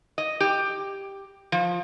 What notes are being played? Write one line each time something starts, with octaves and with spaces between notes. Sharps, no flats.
D#5
G4
F3